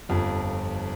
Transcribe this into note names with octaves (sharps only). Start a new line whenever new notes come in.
G1 F2 F3